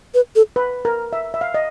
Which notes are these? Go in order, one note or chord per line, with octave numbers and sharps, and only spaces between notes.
B4
A4
B4
A#4
E5
E5
F5
D#5